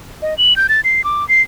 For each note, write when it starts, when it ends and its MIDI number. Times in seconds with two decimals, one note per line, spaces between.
0.22 0.37 75
0.38 0.56 102
0.56 0.67 91
0.69 0.81 93
0.84 1.04 96
1.04 1.27 86
1.29 1.42 96